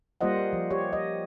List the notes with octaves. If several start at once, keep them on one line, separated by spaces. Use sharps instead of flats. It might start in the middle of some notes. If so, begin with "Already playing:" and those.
G3 A#3 F4 C5 D#5 F#5
F3
G4 C#5
D#5